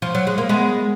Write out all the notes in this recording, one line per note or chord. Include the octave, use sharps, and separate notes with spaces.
F3
F#3
G#3
A#3
G#3 B3